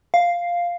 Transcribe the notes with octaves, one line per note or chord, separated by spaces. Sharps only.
F5